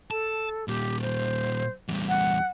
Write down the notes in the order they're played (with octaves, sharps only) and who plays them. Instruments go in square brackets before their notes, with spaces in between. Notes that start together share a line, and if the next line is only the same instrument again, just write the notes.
[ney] A4 [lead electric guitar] A5
[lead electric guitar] A#2 G3 [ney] G4
[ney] C5
[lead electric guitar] E2 G3
[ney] F#5